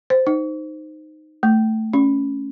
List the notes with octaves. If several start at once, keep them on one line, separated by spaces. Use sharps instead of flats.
C5
D#4
A3
C#4